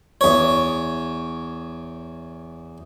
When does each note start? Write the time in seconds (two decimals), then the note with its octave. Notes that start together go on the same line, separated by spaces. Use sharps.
0.21 E2 C#5